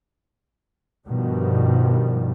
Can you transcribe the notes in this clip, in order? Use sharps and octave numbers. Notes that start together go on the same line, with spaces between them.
G2 B2 D#3 F3 G3